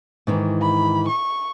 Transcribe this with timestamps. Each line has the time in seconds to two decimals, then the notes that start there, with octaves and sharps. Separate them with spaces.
0.27 G#2 D#3 E3
0.62 B5
1.08 C#6